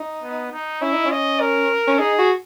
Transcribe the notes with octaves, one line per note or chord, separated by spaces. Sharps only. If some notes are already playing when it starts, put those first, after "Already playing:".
Already playing: D#4
B3
D#4
C#4 E4
D#4
C#4
D#5
A#4
C#4
D#4 G#4
F#4